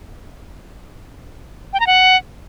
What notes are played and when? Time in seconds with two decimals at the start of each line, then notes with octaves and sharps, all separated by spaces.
1.73 G5
1.80 A#5
1.87 F#5